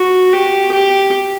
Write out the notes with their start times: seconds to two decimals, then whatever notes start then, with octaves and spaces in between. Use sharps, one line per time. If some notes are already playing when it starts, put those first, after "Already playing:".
Already playing: F#4
0.33 G4
0.72 G4